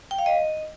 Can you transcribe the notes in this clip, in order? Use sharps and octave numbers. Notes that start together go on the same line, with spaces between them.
G5
F5
D#5